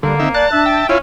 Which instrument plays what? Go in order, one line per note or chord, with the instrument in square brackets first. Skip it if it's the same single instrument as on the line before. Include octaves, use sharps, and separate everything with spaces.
[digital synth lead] D3 [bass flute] G3 [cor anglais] A#3
[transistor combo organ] D#3 E5 [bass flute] C4
[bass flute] D5 [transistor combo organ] A5 [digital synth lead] F#6
[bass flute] D4 [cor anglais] E5
[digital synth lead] G5
[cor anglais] C#4 [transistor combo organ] E4 F4 [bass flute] C#5